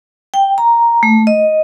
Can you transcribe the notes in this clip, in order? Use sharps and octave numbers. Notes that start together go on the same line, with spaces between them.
G5
A#5
A3
D#5